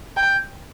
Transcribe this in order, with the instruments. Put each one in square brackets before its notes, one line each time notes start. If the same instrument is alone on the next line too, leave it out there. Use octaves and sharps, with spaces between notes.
[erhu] G5